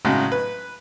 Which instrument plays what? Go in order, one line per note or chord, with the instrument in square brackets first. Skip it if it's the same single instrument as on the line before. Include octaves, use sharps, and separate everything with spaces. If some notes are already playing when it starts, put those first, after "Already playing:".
[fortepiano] A2 C#3 F#3 G#3
B4